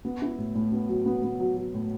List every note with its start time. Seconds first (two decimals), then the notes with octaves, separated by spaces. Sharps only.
0.05 B3
0.22 E4
0.38 A2
0.55 A2
0.72 B3
0.88 F#3
1.06 B3
1.23 B3
1.40 F#3
1.57 F#3
1.74 A2